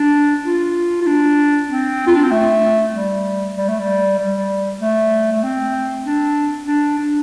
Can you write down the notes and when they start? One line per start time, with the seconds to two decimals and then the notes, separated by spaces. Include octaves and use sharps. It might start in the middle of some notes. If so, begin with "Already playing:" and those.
Already playing: D4
0.46 F4
1.02 F4
1.07 D4
1.70 C4
2.07 F4
2.15 D4
2.23 C4
2.31 A3
2.93 G3
3.57 G3
3.69 A3
3.79 G3
4.18 G3
4.81 A3
5.32 A3
5.43 C4
6.05 D4
6.67 D4
6.98 D4